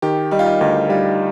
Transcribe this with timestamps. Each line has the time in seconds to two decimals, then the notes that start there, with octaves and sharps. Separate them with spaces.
0.02 D#3 G4
0.31 G3 D#4
0.39 F4
0.46 D#4
0.61 D2 D#4
0.89 G3 F4